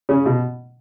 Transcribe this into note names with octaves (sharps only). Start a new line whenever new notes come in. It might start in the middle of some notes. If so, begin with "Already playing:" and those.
C#3
B2